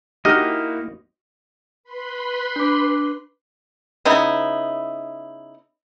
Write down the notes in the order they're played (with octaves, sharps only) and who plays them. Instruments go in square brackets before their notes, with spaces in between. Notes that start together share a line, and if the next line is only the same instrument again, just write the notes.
[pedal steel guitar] A#3 E4 F6 [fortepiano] D#4 F#4 G4 [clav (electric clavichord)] D#5
[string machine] B4 B5 C6
[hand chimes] D4 D6
[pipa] C#3 B3 D#4 E4